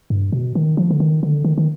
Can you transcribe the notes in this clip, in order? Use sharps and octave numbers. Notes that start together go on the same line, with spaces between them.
G2
B2
D#3
F3
D3
D#3
D3
D#3
D#3